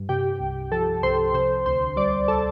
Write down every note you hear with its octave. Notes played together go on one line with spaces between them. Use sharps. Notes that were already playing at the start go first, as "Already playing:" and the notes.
Already playing: G2
C3 G4 G5
C2
F3 A4 A5
C2 C5 C6
C3 C5 C6
D2 C5 C6
G3 D5 D6
A4 A5